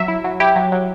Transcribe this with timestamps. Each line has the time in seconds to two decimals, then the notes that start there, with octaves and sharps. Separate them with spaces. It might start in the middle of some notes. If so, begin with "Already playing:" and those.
Already playing: F#3 E5
0.08 E4
0.24 F#3
0.40 E4 G4
0.56 F#3
0.72 F#3